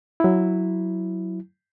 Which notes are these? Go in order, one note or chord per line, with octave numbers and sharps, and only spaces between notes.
F#3 E4